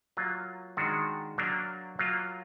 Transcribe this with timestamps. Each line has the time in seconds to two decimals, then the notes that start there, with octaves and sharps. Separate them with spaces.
0.17 F#3 A#3 F4
0.77 D#3 G#3 D4 F#4
1.38 F#3 A#3 D4
1.99 F#3 A#3 F4